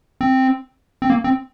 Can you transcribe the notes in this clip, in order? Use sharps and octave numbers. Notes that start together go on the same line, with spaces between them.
C4
C4
A#3
C4